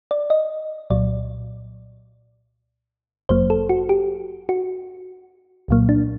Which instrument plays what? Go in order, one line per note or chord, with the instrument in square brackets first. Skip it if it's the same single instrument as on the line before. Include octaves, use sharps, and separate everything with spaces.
[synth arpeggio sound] D5
D#5
C2 A#2 F#3 D5
G1 F#2 F#3 A#3 C5
A4
F#4
G4
F#4
C2 A#2 F#3 A#3
D4